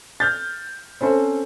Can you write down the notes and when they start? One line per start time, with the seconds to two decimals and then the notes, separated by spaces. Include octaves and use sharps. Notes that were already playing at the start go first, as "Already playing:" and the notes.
0.20 F6 G6 A6
1.01 C4 C#4 A4 C5